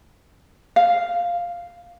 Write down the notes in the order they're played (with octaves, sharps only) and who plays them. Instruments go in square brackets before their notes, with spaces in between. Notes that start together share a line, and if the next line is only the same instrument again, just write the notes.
[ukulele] F5